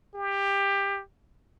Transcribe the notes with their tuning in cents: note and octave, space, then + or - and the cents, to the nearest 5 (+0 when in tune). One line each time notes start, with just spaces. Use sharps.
G4 +20